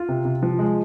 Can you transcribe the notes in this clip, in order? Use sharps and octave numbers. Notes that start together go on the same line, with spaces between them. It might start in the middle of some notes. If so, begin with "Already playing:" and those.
Already playing: F4
C3
C3
F3
G#3